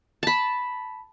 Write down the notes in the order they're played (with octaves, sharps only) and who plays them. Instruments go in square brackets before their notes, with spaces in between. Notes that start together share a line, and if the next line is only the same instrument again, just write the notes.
[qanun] A5 B5